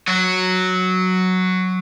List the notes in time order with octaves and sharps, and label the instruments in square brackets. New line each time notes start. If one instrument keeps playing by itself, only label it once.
[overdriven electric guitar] F#3 F#4